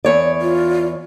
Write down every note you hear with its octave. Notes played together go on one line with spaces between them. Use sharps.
E2 C#5 D5
F4